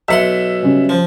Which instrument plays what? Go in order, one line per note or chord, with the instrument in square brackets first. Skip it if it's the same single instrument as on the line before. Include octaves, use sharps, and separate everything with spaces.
[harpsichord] B1 F#5 C6 [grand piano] E5
[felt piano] C#3 G3 C#4
[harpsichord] F3